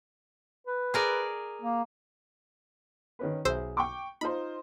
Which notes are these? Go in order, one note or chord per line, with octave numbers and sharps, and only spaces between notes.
B4
G#4 A#4 D5
A#3
D#3 C#4 B4
B1 G#4 C5 E5 E6
G5 C#6 D6
D#4 F4 C5 B5